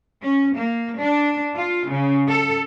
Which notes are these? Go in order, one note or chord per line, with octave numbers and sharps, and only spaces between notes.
C#4
A#3
D4
F4
C#3
A4